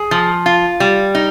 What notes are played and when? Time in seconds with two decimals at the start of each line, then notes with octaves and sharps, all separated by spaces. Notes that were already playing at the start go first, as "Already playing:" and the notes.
Already playing: G#4
0.11 F3
0.46 F4
0.80 G3
1.15 D#4